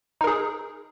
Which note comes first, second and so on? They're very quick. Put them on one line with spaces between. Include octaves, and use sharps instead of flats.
D#4 A#4 G#4